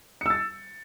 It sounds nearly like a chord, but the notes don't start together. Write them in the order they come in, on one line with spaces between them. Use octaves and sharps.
C#7 E6 A6